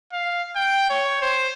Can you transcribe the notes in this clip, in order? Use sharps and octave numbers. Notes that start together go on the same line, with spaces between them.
F5
G5
C#5
C5